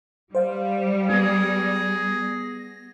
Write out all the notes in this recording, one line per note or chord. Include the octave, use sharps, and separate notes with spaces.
G3 C5 F5
B3 G#4 A#6